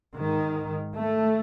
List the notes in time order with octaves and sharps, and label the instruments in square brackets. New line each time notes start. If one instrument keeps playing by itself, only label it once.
[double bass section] G#2 D#3
A3